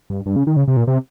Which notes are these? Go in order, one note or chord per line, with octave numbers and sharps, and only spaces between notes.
G2
G2
C#3
D#3
C#3
C3
A#2
C3